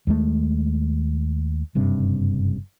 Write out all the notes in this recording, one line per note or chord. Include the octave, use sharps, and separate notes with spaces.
D#2 G#3 A3
F#1 G2 C3